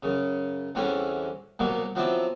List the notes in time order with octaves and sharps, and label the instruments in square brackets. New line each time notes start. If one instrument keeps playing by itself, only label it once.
[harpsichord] F#2 C#3
E2 D3 E3 G3 C4 C#4
C2 B2 F#3 G3 A#3
F3 F#3 B3 C4 E4 D5